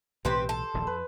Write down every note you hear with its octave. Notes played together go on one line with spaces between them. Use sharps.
B1 A2 E3 C4 G4 B4 C5
A4
D#1 A#1 E2
F2 B4